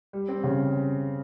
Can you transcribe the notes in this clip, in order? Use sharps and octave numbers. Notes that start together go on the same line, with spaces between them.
G3
C4
C#3